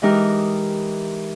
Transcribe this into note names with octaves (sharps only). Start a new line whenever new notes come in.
E3 G#3 D#4 E4 G4 A#4